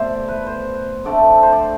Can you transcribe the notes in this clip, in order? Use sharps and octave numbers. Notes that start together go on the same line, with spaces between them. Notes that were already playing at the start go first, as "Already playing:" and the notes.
Already playing: B2 A3 C4 C5 D5 E5
B4
C5
D3 A3 C4 D5
C5
D5